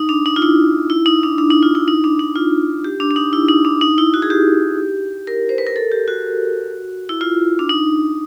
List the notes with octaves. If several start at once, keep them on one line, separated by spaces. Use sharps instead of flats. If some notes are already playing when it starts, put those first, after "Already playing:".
Already playing: D#4
D4
D#4
F4
E4
E4
D#4
D4
D4
D#4
F4
E4
D#4
D4
D#4
F4
G4
D4
D4
D#4
E4
D#4
D4
D#4
E4
F#4
G#4
G4
A#4
C5
B4
A#4
A4
G4
F#4
E4
F4
D4
D#4